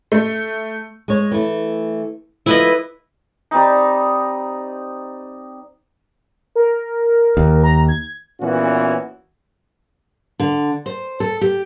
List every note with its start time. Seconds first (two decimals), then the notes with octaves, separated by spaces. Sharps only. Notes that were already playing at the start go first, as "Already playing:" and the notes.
0.12 A3
1.08 G#3 C#5
1.31 E3 A3
2.46 F3 A3 E4 B4 D#5
3.51 G3 C4 D#4
6.56 A#4
7.37 D#2
7.63 A#5
7.88 G#6
8.41 A#2 E3 B3 C#4 F#4
10.40 D3
10.86 C5
11.20 A4
11.41 G4